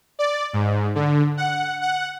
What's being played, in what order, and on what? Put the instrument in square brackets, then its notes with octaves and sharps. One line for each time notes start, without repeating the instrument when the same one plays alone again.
[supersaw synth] D5
G#2
D3
F#5
F#5